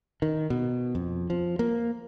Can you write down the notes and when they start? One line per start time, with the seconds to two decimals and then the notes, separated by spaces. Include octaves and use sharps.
0.22 D#3
0.50 B2
0.95 F2
1.30 F3
1.59 A#3